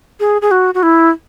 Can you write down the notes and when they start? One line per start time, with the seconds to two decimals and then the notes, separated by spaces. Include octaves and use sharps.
0.20 G#4
0.42 G#4
0.51 F#4
0.74 F#4
0.83 E4